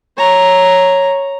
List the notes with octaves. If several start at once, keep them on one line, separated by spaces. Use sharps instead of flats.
C#5 A#5